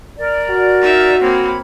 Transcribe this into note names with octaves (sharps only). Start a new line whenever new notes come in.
A#4 D5
F#4
D#4 E5
A#3 C4 C#5 B5